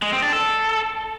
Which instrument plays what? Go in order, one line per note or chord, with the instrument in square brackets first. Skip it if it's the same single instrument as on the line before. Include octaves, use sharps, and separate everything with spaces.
[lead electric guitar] G#3
C4
D4
A4